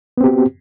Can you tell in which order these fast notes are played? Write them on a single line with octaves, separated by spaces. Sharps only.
B3 C4 G4 F#4